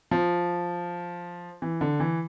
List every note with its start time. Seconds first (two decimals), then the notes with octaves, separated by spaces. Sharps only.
0.11 F3
1.62 E3
1.81 D3
2.00 E3